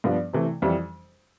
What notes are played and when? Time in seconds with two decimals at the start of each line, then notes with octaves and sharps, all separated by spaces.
0.04 G2 F3 B3 D4
0.33 C3 E3 A3
0.62 F2 E3 G3